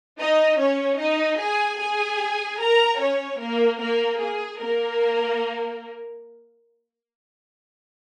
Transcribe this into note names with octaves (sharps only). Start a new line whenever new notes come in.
D#4 D#5
C#4 C#5
D#4 D#5
G#4 G#5
G#4 G#5
A#4 A#5
C#4 C#5
A#3 A#4
A#3 A#4
G#4
A#3 A#4